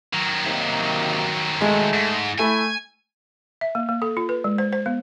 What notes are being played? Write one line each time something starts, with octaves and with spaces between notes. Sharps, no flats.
D#3 F#3
C3 A#3 D#4
G#3 A3
G#2
A3 E4 G#5
E5
A#3
A#3
A4
F4
B4
G#3
C5
C5
B3